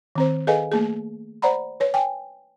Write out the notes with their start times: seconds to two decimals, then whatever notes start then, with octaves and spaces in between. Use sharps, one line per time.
0.15 D#3 C4 C5
0.47 G#4 A4 B4 D#5 F5 G#5
0.72 A3 A#3 G#4
1.42 C5 D5 F#5 A#5 B5
1.80 B4 C#5
1.94 G5 G#5